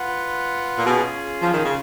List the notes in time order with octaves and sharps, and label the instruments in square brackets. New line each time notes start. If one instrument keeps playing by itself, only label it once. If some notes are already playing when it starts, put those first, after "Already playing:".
Already playing: [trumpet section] F4 B4 F#5
[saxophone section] A#2
[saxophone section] B2 [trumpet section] C#4 F4 G#4
[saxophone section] F3
D#3
C#3